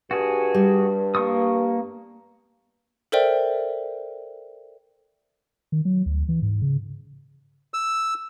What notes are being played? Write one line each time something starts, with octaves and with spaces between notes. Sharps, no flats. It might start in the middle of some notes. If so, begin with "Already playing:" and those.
G2 F#4 G#4
G3
A#3 C#6 D#6
A4 A#4 C5 D5 E5 G5
D#3
F#3
D2
E3
G#2
C#3
E6